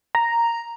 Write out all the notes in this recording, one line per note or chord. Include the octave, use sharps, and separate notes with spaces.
A#5